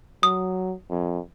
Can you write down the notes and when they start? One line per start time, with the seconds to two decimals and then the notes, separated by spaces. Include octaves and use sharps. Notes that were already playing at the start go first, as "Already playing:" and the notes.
0.23 F#3 D#6
0.90 F2